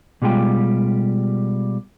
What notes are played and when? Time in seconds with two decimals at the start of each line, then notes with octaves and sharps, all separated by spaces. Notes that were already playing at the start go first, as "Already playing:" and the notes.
0.22 B2 G3 G#3 F4 G4